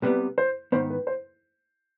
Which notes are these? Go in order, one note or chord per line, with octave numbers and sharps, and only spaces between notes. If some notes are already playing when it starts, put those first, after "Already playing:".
C2 C3 G3 B3 B4
C5
G#2 D#3 B3 C5
B4
C5